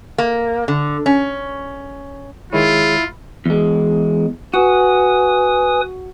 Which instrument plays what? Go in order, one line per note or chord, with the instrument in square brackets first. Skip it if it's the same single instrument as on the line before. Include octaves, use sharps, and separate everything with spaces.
[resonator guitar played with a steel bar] A#3
D3
C#4
[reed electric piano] D#3 G#3 C#5 [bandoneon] E4 [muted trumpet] F4 [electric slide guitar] G#4
[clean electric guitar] E2 G#3
[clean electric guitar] F#4 [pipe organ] B4 G#5 D#6